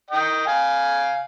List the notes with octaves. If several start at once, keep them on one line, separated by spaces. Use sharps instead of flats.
D#5 G5
F5 G#5